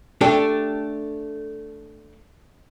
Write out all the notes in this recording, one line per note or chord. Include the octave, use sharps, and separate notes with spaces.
A3 D4 G4 A4